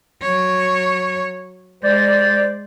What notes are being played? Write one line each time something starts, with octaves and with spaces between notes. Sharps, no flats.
F#3 C#5
G#3 C5 D5